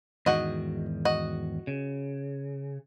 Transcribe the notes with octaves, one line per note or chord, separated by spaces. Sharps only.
E2 G#2 D#3 F#4 D#5
F#4 D#5
C#3